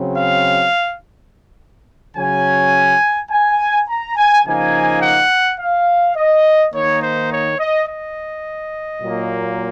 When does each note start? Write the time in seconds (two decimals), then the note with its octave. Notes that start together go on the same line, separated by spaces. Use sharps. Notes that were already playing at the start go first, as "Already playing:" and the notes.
Already playing: C#3 F#3 C4
0.17 F5
2.17 C#3 F#3 C#4 G#5
3.31 G#5
3.88 A#5
4.16 G#5
4.45 C#3 F3 A#3 D#4 G#5
5.02 F#5
5.59 F5
6.16 D#5
6.74 D#3 A#3 D#4 C#5
7.02 C5
7.31 C#5
7.59 D#5
7.88 D#5
9.01 A#2 F#3 A#3